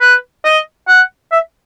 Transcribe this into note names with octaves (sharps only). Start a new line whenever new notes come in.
B4
D#5
F#5
E5